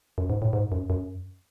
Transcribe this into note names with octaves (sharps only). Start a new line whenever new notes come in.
F#2
G#2
A2
G#2
F#2
F#2